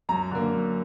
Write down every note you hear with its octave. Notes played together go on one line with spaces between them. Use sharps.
F#2 A#5
D3 A#3
F#2